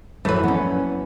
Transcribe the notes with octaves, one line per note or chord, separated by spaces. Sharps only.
A#1 F#2 E3 F#3 A3 B4
B3 C#4